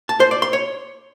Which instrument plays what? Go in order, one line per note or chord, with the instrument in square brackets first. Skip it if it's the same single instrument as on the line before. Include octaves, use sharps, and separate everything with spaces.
[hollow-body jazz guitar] A5
C5
D5
C6
C#5